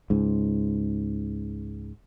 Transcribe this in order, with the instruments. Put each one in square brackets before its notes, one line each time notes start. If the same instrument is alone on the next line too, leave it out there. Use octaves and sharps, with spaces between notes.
[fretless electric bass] C#2 G#2